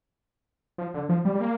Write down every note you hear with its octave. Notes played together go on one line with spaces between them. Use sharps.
F3
D3
F3
G3
G3
A#3